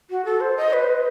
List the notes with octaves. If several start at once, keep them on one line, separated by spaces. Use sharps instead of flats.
F#4
A4
C5
D#5
B4
C5
B4